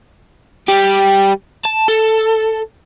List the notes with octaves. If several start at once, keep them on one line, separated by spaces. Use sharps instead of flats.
G3 G4
A5
A4